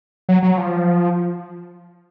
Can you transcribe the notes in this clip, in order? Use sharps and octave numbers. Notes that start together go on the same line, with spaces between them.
F#3
F#3
F3